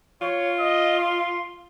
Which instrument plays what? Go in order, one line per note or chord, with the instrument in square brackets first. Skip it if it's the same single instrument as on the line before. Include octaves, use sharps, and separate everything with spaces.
[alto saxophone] F4 [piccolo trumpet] C#5
[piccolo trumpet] D#5
C6